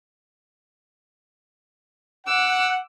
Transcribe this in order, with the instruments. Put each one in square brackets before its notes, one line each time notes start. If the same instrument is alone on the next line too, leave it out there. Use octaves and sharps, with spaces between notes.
[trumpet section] F#5 [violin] D6 E6